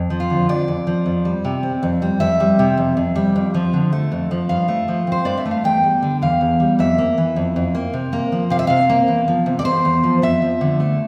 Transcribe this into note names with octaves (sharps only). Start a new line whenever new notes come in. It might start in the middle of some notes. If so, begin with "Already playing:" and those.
Already playing: F2
F3
F4
D3
F2 D5
F2
F3
F2
G3
C3
C4
F2
G3
F2 E5
G3
C3
F2
F2
G3
F2
F3
D3
A3
F2
F3
G2 F5
A3
F3
C4 C5
G2 D5
E5
A3
F5
E2 G5
G3
D3
E2 F5
E2
G3
F2 E5
A#3
E3
F2
F2
A#3
C3
A#3
F3
C3 F5
E5
C3 F5
A#3
E2
F3
C3
D5
E2 C5
E2
F3
F2 E5
F3
D3
A3